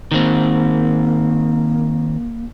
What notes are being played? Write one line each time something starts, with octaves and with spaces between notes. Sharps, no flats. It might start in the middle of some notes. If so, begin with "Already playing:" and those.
D#3 A#3 C4